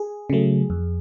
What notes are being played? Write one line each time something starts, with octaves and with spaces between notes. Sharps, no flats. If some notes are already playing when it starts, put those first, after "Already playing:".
Already playing: G#4
C#3 F#3 A3
F2